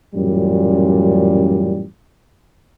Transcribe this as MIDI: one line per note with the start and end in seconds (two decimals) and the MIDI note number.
0.15 1.85 33
0.15 1.85 42
0.15 1.85 46
0.15 1.85 55